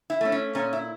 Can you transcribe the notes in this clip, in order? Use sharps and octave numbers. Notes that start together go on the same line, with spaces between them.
E4
A3 C#4
C#4
A#2 C#4
E4